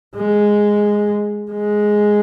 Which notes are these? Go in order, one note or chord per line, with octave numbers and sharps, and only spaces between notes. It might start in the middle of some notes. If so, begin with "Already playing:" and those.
G#3
G#3